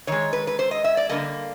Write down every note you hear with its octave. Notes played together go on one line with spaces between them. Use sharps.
D#3 G#3 C#5
B4
B4
C5
D#5
E5
D5
D3 G3 A#3 D#5